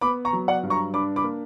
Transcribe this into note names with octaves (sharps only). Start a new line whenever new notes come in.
B3 B5 D6
A#5 C#6
F#3
D5 F#5
G2
A#5 C#6
D4 B5 D6
B5 D6
A#3